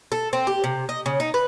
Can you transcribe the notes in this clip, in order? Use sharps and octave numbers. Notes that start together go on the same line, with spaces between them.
A4
C4
G4
C3
D#5
C#3
D#4
B4